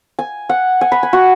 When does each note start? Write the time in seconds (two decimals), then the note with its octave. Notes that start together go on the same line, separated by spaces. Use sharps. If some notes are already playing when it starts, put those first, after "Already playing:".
0.19 G#5
0.49 F#5
0.81 G#5
0.92 B5
1.03 G#5
1.13 F#4